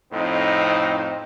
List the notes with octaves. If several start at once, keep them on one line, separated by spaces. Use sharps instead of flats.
F2 A2 C4 D#4